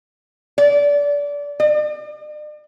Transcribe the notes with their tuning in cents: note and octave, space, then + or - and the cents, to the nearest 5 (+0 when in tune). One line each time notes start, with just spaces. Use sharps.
D5 -25
D5 +40